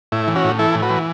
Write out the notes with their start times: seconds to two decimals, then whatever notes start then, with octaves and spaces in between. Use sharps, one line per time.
0.12 A2 E4
0.28 E3
0.35 C#4 F#4
0.44 A2
0.59 E3 E4 A4
0.75 A2
0.82 F#4 B4
0.90 E3